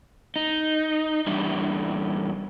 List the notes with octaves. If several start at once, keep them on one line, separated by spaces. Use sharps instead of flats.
D#4
E2 G3 D4 E5